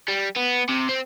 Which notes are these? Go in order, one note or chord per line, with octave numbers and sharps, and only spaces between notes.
G3
B3
C3
C4